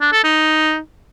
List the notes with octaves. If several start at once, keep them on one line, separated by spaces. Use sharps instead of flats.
D4
A4
D#4